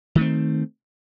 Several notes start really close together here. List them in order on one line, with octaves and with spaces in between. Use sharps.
D#3 A3 C4